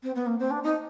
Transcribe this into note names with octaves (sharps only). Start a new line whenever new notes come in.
C4
B3
A#3
C4
D4
D#4